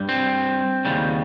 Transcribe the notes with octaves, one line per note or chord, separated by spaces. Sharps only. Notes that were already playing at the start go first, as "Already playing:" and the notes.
Already playing: G2 G3
C4
D#2 C#3 G3